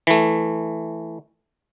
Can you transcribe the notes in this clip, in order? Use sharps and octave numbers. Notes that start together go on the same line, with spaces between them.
E3 A3